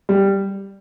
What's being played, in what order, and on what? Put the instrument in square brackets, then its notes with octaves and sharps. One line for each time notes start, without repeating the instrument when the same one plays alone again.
[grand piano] G3